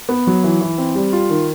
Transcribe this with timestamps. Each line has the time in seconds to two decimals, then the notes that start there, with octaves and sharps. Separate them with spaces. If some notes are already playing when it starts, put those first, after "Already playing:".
0.09 B3
0.27 F#3
0.44 E3
0.61 E3
0.78 C4
0.95 G3
1.13 F4
1.30 D#3